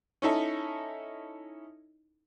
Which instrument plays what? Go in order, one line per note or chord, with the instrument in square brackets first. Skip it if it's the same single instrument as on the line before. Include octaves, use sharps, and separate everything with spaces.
[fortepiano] C#4 D#4 E4 A4